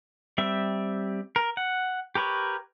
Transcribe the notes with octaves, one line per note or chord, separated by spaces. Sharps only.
G3 C4 E5
A#4
F#5
G4 A#4 B4 C#5